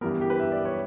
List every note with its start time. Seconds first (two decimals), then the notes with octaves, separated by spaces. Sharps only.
0.01 G2 E3 G3 B3 A#4
0.21 G4
0.30 B4
0.40 E5
0.52 D5
0.65 C#5